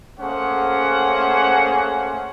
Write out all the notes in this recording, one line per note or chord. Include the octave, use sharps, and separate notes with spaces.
A3 A#3 C#4 G#4 C5 F#5